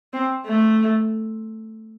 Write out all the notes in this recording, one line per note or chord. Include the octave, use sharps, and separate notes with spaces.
C4
A3